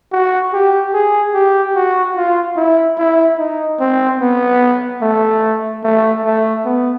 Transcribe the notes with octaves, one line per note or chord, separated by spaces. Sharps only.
F#4
G4
G#4
G4
F#4
F4
E4
E4
D#4
C4
B3
A3
A3
A3
B3